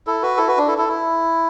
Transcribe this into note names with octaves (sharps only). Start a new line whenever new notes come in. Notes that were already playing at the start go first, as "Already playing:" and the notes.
E4 A4
F#4 B4
E4 A4
F#4 B4
D4
E4 A4
E4 A4
E4